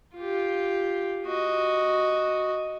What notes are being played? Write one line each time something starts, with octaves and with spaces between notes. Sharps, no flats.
F4 G4
F#4 D#5